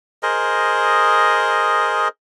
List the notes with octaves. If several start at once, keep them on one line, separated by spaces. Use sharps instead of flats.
G#4 A#4 C5 D#5